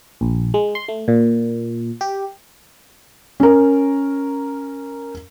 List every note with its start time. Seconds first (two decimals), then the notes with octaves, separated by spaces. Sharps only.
0.21 A#1
0.54 G#3
0.75 C6
0.88 A3
1.08 A#2
2.01 G4
3.40 C#4 A#4